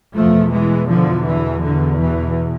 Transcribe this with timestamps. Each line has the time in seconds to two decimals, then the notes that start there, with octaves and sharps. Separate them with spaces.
0.15 E2 B2 F3 A3
0.52 E3 G#3
0.88 D3 F3
1.26 E3
1.62 D3
1.99 E3